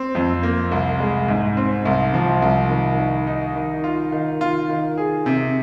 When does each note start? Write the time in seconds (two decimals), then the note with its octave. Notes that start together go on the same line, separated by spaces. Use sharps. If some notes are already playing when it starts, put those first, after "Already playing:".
Already playing: C4
0.15 F2
0.43 A#3
0.71 C2
1.00 G#3
1.28 G#2
1.57 C4
1.85 C2
2.14 F3
2.42 C2
2.70 D#3
2.98 D#3
3.27 D#4
3.56 D#3
3.84 F4
4.12 D#3
4.41 F4
4.69 D#3
4.98 G#4
5.26 C3